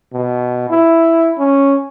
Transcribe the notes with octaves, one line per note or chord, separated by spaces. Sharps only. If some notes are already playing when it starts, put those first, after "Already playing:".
B2
E4
C#4